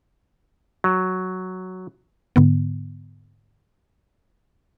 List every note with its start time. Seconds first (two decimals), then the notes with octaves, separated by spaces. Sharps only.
0.84 F#3
2.36 G#2 D3 B3